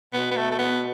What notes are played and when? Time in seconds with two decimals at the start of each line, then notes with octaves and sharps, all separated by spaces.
0.13 B2 B3
0.31 B3
0.36 A3
0.51 A3
0.59 B3